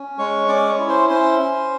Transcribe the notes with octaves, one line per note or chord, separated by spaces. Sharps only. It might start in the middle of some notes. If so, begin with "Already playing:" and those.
Already playing: C#4
G#3 C#5 C#6
C#4 D5 D6
C#5 C#6
E4
C5 C6
C#4 C5 C6
C#4